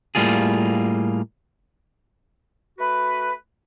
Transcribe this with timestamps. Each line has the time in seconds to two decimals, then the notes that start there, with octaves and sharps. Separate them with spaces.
0.15 A2 G3 A#3 F4 G#4
2.78 A3 F#4 B4